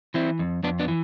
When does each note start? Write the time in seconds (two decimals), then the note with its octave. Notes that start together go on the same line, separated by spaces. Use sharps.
0.14 E3 C4 E4
0.39 F2
0.63 F2 B3 D4
0.79 B3 D4
0.88 E3